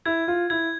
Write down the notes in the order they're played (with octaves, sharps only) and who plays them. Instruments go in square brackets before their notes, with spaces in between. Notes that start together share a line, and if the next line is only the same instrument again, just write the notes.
[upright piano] E4 [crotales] G#6
[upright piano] F4
[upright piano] E4 [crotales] G#6